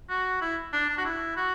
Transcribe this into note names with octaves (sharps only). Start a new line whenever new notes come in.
F#4
E4
D4
D4
F#4
E4
F#4